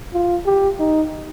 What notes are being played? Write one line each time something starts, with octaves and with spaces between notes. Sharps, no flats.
F4
G4
D#4